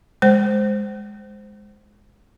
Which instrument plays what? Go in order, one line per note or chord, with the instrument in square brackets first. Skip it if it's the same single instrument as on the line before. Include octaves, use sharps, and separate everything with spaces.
[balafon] G#3 C5